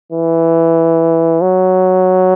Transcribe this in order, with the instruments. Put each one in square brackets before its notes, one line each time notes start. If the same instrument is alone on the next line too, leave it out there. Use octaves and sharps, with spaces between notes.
[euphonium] E3
F#3